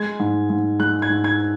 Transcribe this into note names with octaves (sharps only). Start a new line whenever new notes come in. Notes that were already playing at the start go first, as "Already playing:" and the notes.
Already playing: G#3 G#6
G#2
G#2
G#3 F#6
G#6
G#2
G#6